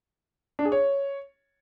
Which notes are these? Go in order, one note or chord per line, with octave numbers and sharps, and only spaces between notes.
D4
G#4
C#5